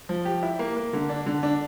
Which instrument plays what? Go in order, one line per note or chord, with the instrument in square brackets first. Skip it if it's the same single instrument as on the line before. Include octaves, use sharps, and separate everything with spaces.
[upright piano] F3
G4
E4
A#3
A#3
D3
D4
D3
D4